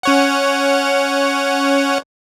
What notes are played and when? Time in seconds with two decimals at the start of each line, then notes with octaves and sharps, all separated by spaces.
0.03 C#4 C#5 F#5